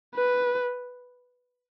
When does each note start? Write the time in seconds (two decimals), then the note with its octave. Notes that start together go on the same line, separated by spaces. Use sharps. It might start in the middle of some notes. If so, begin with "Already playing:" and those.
0.15 B4